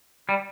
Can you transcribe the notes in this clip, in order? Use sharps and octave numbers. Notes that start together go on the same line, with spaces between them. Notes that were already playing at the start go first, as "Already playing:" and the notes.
G3